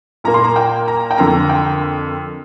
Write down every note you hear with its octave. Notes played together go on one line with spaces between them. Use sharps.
A#2 A#3 A#5
C6
A#5
G5
A#5
G5
F2 D3 A#3 A#5
G5